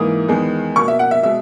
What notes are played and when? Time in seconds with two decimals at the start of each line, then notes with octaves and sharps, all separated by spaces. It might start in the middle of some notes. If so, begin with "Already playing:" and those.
Already playing: G#2 E3 A#3 D#6
0.28 E2 D#3 G#3 B3
0.76 B2 A#3 C#6
0.88 E5
0.99 F#5
1.11 E5
1.23 B2 G#3 E5